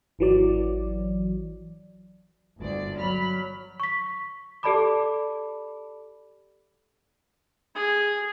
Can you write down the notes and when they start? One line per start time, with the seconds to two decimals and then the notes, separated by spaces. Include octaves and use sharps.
0.19 G#1 E3 F#3 D5
2.59 G1 D2 D5
2.97 F#3 B5 F6
3.80 C#6 B6
4.63 G4 A4 D5 A5 B5 D6
7.75 G#4